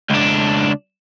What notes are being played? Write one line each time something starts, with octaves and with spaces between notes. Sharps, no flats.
C#2 D4